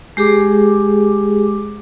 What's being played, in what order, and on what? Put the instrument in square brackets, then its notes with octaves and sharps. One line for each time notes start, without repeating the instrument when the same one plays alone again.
[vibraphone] G#3 G4 G#4 D6